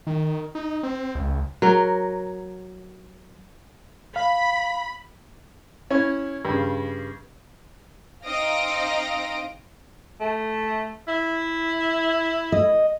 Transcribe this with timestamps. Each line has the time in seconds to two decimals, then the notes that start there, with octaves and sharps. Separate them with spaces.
0.07 D#3
0.55 D#4
0.83 C4
1.15 C#2
1.62 F#3 A#4
4.16 F5 B5
5.90 C#4 E4 C#5
6.45 G2 C#3
8.27 C4 D#4 D#5 F5 A#6 D7
10.20 A3
11.07 E4
12.52 D#5